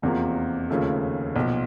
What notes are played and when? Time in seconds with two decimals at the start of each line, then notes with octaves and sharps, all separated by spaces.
0.02 F1 E2 C3 F3 A#3
0.70 D#2 C#3 F3 A3
1.36 B1 A#2 F3